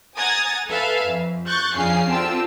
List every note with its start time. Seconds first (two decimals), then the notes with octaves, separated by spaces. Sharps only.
0.16 F#5 G#5 A#5 D#6 G#6 A6
0.69 A4 B4 E5 F5 G#5
1.06 F2
1.47 C#6 F#6 G6 A6
1.76 F2 C#3 D4 G#4 F5 C7
2.09 D3 C4 F4 G4 A5 E6